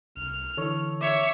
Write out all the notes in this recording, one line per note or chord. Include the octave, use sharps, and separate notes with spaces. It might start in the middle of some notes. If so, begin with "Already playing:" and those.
C2 F6
D3 E3 A4 C#5 C#6
C#5 E5 D6